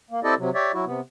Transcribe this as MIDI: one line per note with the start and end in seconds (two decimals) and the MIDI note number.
0.11 0.20 58
0.24 0.34 60
0.24 0.34 64
0.24 0.34 67
0.24 0.34 69
0.24 0.34 74
0.24 0.34 75
0.38 0.50 48
0.38 0.50 54
0.55 0.72 67
0.55 0.72 73
0.55 0.72 74
0.55 0.72 76
0.73 0.85 54
0.73 0.85 64
0.73 0.85 66
0.86 1.01 48
0.86 1.01 59